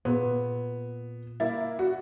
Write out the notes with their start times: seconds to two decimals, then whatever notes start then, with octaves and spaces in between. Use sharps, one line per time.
0.05 A#2 B3
1.40 A#3 E4 A6
1.79 F#4